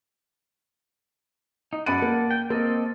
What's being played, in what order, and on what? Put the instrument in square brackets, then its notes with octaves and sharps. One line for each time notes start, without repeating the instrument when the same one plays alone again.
[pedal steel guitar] D#4
[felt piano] F#2 B5 D#7 [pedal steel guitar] A4 D5 F#5
[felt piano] A#3
[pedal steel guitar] G5
[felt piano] A#3 [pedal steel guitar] C4 A4 D#5